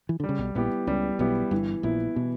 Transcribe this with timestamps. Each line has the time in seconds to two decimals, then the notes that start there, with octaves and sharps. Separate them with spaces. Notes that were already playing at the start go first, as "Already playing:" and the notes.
0.09 E3
0.20 D3
0.24 G3
0.29 C#3
0.39 B1 B2
0.55 A#1 A#2 B3 E4 G4
0.87 C#2 C#3 G3
1.19 B1 B2 B3 E4 G4
1.51 G1 G2 E3
1.83 A#1 A#2 B3 E4
2.16 B2 E3